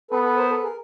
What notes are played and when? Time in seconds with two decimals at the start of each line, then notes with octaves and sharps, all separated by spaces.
0.11 B3 A4 B4
0.24 A4 B4
0.37 A#4 C5
0.50 A4 B4
0.63 G#4 A#4